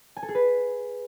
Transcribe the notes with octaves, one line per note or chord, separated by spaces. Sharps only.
G#5
A4
G#4
B4